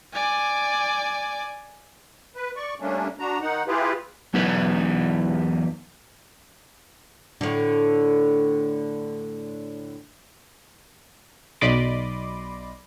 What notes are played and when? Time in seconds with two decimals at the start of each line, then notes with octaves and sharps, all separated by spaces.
0.13 D5 G#5
2.36 B4
2.56 D5 C#6
2.80 G3 A3 A#3 C#4 D4
3.19 D4 F#4 A#5
3.41 D#3 D#4 F#5
3.68 E4 F4 G4 G#4 B4
4.34 E2 F#3 B3 D#4 B4
7.41 A2 D3
11.61 B1 D5 D#5 B5 C6 D6